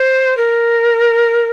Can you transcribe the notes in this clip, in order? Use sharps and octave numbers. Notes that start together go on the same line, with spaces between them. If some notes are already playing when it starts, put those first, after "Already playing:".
Already playing: C5
A#4